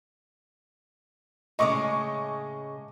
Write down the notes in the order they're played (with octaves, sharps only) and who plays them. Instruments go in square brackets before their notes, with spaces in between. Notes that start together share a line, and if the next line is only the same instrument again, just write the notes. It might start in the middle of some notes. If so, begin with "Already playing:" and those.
[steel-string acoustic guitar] A2 C#3 G#3 [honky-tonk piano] D#5 C#6 D6